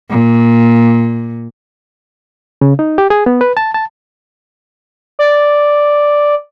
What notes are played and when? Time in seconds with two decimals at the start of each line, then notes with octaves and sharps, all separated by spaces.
0.10 A#2
2.61 C#3
2.79 D#4
2.98 G4
3.10 G#4
3.26 B3
3.41 B4
3.57 A5
3.74 A5
5.19 D5